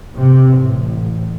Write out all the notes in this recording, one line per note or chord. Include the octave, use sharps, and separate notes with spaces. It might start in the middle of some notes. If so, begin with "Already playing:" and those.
C3
A1